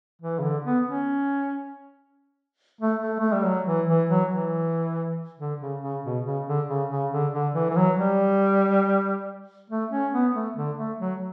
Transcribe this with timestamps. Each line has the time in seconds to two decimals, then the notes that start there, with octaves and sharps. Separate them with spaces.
0.22 E3
0.39 C#3
0.43 D3
0.65 B3
0.87 C#4
2.81 A3
3.02 A3
3.20 A3
3.33 G3
3.45 F#3
3.66 E3
3.88 E3
4.10 F#3
4.31 E3
5.40 D3
5.61 C#3
5.82 C#3
6.04 B2
6.25 C#3
6.47 D3
6.68 C#3
6.90 C#3
7.12 D3
7.33 D3
7.54 E3
7.71 E3
7.76 F#3
7.98 G3
9.70 A3
9.91 C#4
10.13 B3
10.34 A3
10.56 D3
10.78 A3
10.99 F#3